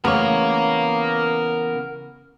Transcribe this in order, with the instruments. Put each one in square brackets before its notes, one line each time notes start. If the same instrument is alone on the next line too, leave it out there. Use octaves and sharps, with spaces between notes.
[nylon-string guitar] C#3 E3 A3 [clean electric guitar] B3 C#5 [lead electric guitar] A#4 F5